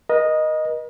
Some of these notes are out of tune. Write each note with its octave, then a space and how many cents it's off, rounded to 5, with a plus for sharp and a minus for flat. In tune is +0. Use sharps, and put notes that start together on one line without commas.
A#4 +45 D#5 -5